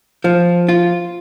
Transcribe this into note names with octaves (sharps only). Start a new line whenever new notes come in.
F3
F4